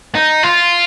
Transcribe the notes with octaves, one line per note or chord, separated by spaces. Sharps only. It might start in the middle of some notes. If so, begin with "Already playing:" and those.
D#4
F4